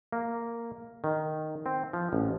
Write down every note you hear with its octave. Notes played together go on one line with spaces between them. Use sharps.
A#3
D#3
C4
F3
A1